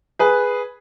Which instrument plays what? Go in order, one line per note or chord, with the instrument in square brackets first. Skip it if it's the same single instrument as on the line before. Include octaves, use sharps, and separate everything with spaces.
[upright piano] G#4 B4